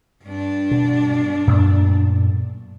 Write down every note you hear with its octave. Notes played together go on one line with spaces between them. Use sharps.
G2 D4
B2
F#2 A#2 A3